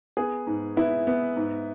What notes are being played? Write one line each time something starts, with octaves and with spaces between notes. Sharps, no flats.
B3 G#4
G#2
B3 E4
B3
G#2